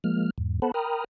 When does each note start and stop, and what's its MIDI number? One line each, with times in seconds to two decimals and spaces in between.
0.04 0.30 53
0.04 0.30 56
0.04 0.30 58
0.04 0.30 89
0.38 0.60 40
0.38 0.60 44
0.62 0.72 59
0.62 0.72 69
0.62 0.72 72
0.62 0.72 78
0.62 0.72 81
0.62 0.72 83
0.74 1.04 70
0.74 1.04 79
0.74 1.04 82
0.74 1.04 83
0.74 1.04 87
0.74 1.04 89